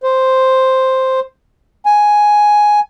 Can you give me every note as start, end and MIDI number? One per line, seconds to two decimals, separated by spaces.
0.03 1.20 72
1.86 2.80 80